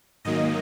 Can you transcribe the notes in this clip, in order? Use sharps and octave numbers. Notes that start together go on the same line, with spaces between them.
G#2 D#3 F#3 A#3 D#5